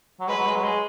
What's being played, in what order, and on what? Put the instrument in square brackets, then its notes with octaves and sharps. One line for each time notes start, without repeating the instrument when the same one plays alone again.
[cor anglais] F#3
[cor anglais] G#3 [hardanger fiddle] B4
[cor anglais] F#3
G#3
F#3
G#3